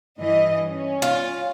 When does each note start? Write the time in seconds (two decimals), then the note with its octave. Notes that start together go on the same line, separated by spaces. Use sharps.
0.20 G2 E3 D#5
0.69 C#4
1.02 F4